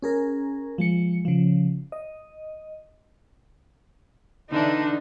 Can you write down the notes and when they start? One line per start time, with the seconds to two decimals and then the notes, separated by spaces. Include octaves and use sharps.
0.02 C#4 G#4 A#4
0.78 F3 G#3 C#7
1.25 C#3 F3
1.92 D#5
4.50 D3 E3 D4 D#4